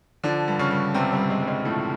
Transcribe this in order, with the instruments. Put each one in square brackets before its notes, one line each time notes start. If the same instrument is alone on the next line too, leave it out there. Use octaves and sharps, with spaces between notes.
[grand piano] D3 F3 D4
G2
C#3 C#4
G2
G2 C3 C4
G3
G2
G#3
G2
G#3
A2 F3 A3